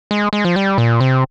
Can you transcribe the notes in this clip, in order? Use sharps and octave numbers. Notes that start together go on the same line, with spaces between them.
G#3
G#3
F3
G3
A#2
C3